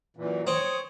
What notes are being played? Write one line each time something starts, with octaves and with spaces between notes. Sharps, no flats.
F#2 A#2 E3
C4 C#5 D#6